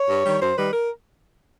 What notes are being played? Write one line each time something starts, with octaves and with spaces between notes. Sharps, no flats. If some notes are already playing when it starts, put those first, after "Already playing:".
Already playing: C#5
G2
D#3 G3
F#2 C5
D#3 G3 B4
A#4